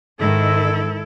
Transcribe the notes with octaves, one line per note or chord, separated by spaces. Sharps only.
G#2 D#3 E4 A4